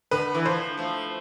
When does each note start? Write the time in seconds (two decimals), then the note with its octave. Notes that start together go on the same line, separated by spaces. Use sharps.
0.11 D3 B4
0.34 E3
0.45 D3 F3 C5
0.77 F3 A3